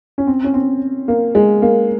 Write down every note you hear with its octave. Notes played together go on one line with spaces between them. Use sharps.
C#4
C4
C#4
C4
A#3
G#3
A#3